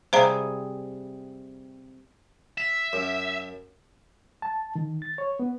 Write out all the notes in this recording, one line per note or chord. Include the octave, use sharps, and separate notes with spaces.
C3 G3 G#4 C5 F5 A#5
E5
F#2
A5
D#3
A6
C#5
B3